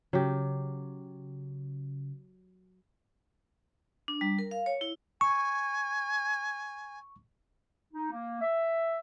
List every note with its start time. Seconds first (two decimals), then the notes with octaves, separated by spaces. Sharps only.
0.13 C#3 F#3 G4
4.08 D4
4.21 G3
4.39 A#4
4.51 F5
4.66 C#5
4.81 E4
5.21 G#5 C#6
7.93 D#4
8.11 A#3
8.42 E5